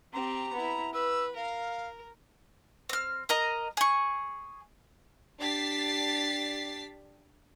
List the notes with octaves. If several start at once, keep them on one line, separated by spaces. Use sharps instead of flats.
C4 G4 A#5
B3 E4
B4 E6
A#4 F5
C4 F6
A#4 D#5 A#5
G#4 C#6
D4 G4 A6 B6 C7